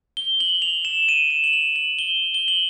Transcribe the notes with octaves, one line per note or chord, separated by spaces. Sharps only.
G7
F#7
F7
E7
D#7
E7
F#7
F7
F#7
G7
G7
F#7